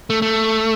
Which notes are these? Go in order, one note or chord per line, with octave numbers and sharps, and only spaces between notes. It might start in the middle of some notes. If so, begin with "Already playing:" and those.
A3
A3